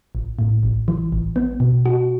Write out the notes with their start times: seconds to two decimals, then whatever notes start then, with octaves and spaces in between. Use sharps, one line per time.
0.15 A1
0.39 A2
0.63 A1
0.88 E3
1.12 A1
1.36 B3
1.60 B2
1.86 F#4